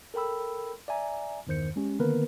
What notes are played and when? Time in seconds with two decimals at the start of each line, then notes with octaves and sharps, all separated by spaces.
0.14 A4 A#4 G5 B5 E6
0.88 D5 E5 G#5 A#5
1.47 E2 G2 D#3 C5 G6 C#7
1.76 G#3 C#4 G4
1.99 D3 D#3 A#3 B3 A#4 B4